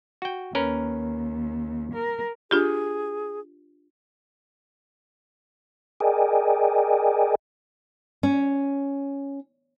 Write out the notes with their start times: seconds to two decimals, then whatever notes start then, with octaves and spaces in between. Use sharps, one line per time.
0.22 F#4 G5
0.55 D#2 C#4 A#4 B4
1.94 A#4
2.51 D4 F4 G4 G#4
6.00 G#4 A#4 D5 D#5 G5 G#5
8.23 C#4